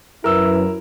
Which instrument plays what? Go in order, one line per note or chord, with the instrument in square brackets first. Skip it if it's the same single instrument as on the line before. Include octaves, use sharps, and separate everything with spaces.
[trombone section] F#2 B4 [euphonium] E4 [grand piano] A#4 E6